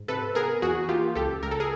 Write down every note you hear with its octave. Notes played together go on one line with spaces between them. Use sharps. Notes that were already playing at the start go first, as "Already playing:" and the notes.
Already playing: G#2
C3 A4 B4
B3 G#4 A#4
E2 F#4 G#4
A#3 F4 G4
C#2 G4 A4
C#2 A#4
A4
G#4 A#4